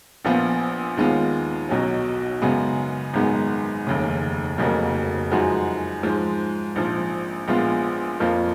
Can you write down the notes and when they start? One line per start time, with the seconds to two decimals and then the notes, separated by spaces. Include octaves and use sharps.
0.25 A#1 A#2 F3 B3 F4
0.97 D#2 D#3 G#3 B3 F4
1.69 B1 B2 F#3 C#4
2.42 F#2 C#3 G#3 B3
3.14 G#1 F#2 D#3 G#3 B3
3.87 F1 D#2 C#3
4.58 F1 F2 C#3 F#3 A#3
5.31 F#2 F3 G#3 D#4 F#4
6.03 G#2 F3 G#3
6.76 A#1 G#2 F3
7.48 A#1 A#2 G#3 B3 F4
8.20 F2 F3 A#3 F4